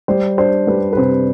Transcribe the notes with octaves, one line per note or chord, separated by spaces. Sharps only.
G3 C5
D4 C5
G3 B4
B4
C3 C5